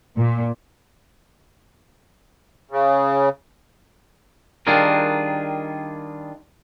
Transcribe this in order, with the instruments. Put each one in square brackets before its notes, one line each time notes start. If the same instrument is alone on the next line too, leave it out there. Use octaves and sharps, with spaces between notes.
[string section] A#2
[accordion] C#3
[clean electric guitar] D#3 G3 D4 F4 G#4 A#4